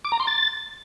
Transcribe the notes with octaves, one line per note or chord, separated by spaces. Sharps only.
D6
A#5
C6
A6